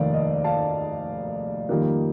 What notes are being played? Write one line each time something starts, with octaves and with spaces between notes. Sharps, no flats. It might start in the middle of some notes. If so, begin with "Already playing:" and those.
Already playing: F1 D#2 D#3 D5 F5
D#5
F5 A5
F2 D#3 G3 A#3